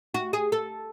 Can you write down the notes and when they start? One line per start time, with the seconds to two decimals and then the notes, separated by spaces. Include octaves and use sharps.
0.14 F#4
0.33 G#4
0.52 A4